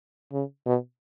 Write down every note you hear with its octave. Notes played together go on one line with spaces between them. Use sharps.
C#3
B2